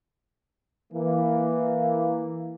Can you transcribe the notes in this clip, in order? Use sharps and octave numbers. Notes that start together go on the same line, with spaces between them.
E3 A#3